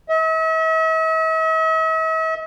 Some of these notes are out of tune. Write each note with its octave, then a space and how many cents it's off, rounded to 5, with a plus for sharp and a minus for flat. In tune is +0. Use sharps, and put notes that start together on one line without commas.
E5 -45